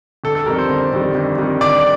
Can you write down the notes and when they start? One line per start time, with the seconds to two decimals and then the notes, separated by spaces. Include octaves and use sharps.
0.24 G1 A4
0.35 A4
0.46 F2 D#3 G3 A#4
0.59 C5
0.69 G1
0.92 F2 D#3 G3
1.15 G1
1.38 F2 D#3 G3
1.61 G1 D5